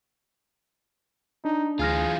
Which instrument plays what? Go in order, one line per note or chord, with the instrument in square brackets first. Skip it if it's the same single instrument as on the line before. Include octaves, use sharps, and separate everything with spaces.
[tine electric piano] D4 [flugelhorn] D#4
[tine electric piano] D2 F6 A#6 [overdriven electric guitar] E3 F4 [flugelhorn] G#4